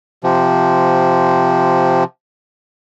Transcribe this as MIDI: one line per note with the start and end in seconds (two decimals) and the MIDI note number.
0.24 2.04 48
0.24 2.04 53